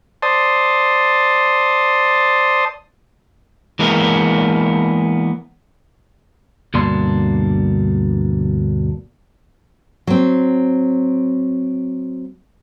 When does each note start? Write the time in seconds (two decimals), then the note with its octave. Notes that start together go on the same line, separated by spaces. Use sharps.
0.23 C5 D5 A5 C6 D#6
3.79 E3 G#3 A#3 B3 A#4
6.74 D2 G2 B2 A#3 D4 C6
10.07 F#3 C4